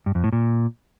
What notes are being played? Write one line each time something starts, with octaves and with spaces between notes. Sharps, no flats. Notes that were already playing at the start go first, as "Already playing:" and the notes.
G2
F2
A2
A#2